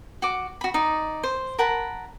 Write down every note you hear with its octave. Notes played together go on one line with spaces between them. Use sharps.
F#4 D6
F#4 B5
D#4 D5
C5
A#4 F#5 A5 B5